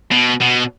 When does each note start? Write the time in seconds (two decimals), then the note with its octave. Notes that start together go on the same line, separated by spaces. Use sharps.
0.11 B2
0.41 B2